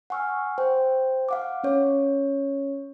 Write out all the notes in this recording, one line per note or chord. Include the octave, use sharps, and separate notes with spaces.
F#5 G#5 C#6 E6 F6
C5 G5
F5 F#5 D6
C#4 C#5